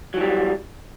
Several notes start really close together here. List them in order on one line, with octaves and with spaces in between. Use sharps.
F#3 E3 G3